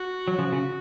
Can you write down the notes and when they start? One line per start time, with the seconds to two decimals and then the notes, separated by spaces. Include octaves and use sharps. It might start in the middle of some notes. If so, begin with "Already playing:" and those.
Already playing: F#4
0.28 F#3
0.38 C#3 F3
0.52 C#3